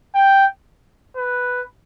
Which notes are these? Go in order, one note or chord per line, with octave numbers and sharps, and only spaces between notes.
G5
B4